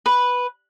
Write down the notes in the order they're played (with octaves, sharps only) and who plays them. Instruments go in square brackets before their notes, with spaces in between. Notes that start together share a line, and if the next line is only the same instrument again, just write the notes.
[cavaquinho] B4